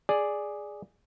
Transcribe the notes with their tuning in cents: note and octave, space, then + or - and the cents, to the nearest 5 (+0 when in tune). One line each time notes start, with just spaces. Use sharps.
G#4 +0 D5 +0